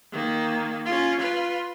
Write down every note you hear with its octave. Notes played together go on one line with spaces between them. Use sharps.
D#3 A#3
C#4 F4
F4 B4